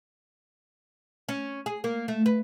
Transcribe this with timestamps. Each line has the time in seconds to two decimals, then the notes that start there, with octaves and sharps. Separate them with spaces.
1.29 C#4
1.66 G#4
1.84 A#3
2.08 A3
2.26 B4